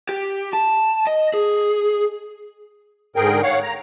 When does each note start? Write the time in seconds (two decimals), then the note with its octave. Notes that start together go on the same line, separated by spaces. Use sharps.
0.09 G4
0.53 A5
1.07 D#5
1.34 G#4
3.16 G#2 D3 G#4 A#4 G5
3.43 C#5 F5 F#5
3.62 A#5